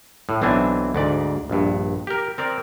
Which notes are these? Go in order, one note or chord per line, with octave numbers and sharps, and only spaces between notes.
A2
B1 E3 C4 D4 G#5
D2 G#2 D5
A#1 G2
G4 A#4
C4 A#4 D5